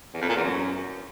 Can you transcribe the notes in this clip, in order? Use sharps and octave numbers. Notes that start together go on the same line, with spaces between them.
E2
F2
A#2
E2
F#2